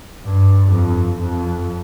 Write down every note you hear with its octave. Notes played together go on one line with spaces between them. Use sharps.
G2
F2
F2